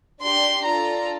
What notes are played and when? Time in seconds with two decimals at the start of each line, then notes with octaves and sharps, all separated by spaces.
0.23 D4 G4 C6
0.65 D4 F4 A4 A#5